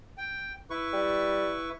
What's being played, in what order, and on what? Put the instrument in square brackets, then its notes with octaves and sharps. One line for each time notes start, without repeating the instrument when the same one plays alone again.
[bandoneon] G5
E4 B4 C#6
[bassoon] G3